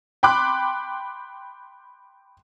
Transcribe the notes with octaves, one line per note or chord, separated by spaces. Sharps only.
G5 B5 C6 D6 F#6